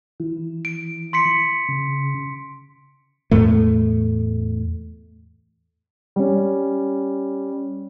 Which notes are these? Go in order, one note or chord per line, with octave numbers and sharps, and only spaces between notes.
E3
D7
C6 B6 C#7
C#3
E2 A2 A3
G3 C#4